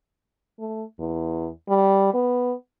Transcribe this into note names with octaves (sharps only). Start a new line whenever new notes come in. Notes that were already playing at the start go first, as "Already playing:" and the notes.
A3
E2
G3
B3